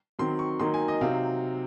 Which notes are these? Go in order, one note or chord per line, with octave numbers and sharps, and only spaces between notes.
D#3 F#3 C4 C6
C#6
D#3 F#3 A#3 D#4 C6
G#5
D#5
C3 F#3 C4 D#4 F5